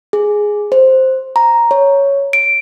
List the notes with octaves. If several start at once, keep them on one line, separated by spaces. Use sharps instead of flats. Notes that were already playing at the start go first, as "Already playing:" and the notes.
G#4
C5
A#5
C#5
D7